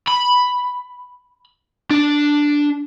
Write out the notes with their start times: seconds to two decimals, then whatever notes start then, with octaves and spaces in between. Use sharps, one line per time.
0.08 B5
1.91 D4